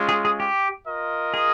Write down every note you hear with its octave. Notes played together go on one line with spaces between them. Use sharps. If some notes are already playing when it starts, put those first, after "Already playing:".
Already playing: G#3 C#4 F4
G#4
G#4
G4
F4 A#4 D#5
G#4